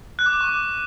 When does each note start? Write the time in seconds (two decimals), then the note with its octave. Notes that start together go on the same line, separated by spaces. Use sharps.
0.19 F#6
0.26 D6
0.33 F#6
0.41 C#6
0.48 D6